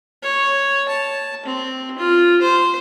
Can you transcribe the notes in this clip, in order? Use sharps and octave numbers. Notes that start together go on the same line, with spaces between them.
C#5
A5
C4
F4
C5